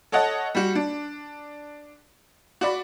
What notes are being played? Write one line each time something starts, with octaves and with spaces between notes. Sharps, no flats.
A4 C#5 D#5 F#5 A5
G3 F#4
D4
F#4 D5 B5